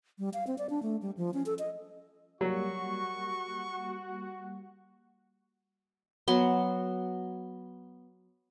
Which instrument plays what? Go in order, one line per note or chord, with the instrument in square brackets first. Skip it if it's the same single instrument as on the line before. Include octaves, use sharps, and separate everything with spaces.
[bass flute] G3
F5
C4
D5
D4
A3
G3
F3
C#4
A4
D#5
[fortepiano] F#3 [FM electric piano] G3 A#3 [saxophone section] F#4 [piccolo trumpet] C#6
[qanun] F#3 B3 C6